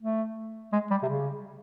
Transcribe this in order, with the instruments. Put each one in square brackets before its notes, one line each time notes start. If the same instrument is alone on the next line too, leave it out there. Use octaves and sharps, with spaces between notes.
[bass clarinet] A3
G#3
G3
C3
C#3